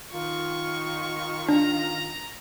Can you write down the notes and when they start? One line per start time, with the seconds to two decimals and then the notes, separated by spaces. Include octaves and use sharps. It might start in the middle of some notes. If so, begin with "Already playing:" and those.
0.12 D#3 F4 C#6
1.49 D4 A#5